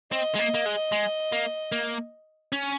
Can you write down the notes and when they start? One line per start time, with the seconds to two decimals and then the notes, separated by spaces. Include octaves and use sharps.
0.12 C4 D#5
0.35 G#3
0.39 A#3
0.54 A#3
0.66 G#3
0.92 G#3
1.32 A#3
1.72 A#3
2.52 C#4